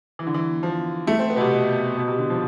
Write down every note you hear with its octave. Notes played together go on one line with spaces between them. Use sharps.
E3
D3
E3
F3
A3
C4
B3
B2
C3
B2
B2
C3
D3
F3